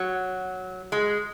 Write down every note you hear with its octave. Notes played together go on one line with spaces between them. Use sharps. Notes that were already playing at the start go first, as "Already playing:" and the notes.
Already playing: F#3
G#3